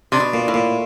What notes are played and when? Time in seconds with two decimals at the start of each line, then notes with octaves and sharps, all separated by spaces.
0.12 C3 D4
0.20 B2
0.34 A#2
0.48 A2
0.54 A#2